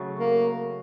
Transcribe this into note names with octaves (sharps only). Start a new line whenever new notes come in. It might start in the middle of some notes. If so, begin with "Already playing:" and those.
Already playing: C#3 F#3 A3
A#3